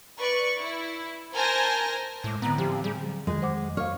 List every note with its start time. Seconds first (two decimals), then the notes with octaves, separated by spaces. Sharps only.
0.18 B4 D5 C#6
0.60 E4
1.35 A#4 C5 G#5 A5 G6 A#6
2.24 A2 G#3 D6 G#6
2.42 A2 D3 B3 C4 A#5
2.58 F3 G4
2.84 G3 G#4
3.05 F#3
3.27 F2 D#3 G#3
3.42 C5 F#5 D6
3.77 C#5 F5 F6